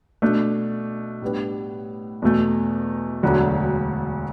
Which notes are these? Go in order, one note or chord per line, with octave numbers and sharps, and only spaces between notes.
B2 A3 D4
A2 G3 B3 D4
E2 B2 A3
E1 D2 D3 F#3